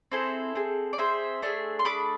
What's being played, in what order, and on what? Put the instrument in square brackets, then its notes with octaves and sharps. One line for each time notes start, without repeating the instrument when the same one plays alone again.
[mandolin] C4 E4 G#4 A4 C5
C4 G#4
D5
C4 G#4 C5 E5
A3 D4 G#4
C6
A3 D4 G#4 B5 D6